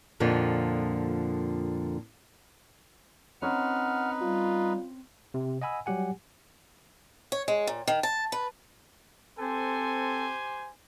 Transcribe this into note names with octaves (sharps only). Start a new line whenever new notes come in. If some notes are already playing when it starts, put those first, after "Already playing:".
F2 A#2 D3 F3
C4 C#4 D#4 B4 C#5 F#5 A#5 F6
G3 F4
C3
D#5 F#5 G#5 B5 E6
F#3 G3 G4 F#5 G#5
C#5
G#3
A#2
D#3
A5
B4
C4 G4 A4 C5 G#5